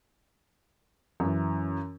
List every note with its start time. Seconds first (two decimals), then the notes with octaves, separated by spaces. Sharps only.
1.20 F#2 E3